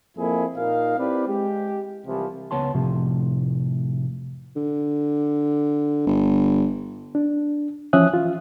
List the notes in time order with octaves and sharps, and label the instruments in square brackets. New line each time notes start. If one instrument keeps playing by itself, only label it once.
[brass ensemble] F2 A#3 E4 G#4 G#5
A#2 A#3 D#4 F5
C4 E4 G4 B4 D5
G#3 G4
C2 C3 E3 F3
[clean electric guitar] C#2 B3 C#5 A5 C6
F2 A2 C3 F3
[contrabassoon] D3
G1
[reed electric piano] D4
E3 F3 C#4 E5 D#6 F#6
F4